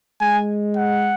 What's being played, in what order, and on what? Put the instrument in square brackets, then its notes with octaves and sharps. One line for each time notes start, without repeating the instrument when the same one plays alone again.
[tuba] G#3 [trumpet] G#5
[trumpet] F#5